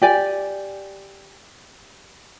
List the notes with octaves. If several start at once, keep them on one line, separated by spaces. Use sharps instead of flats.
G4 D5 G#5